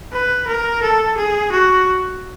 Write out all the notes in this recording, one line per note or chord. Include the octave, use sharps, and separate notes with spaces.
B4
A#4
A4
G#4
F#4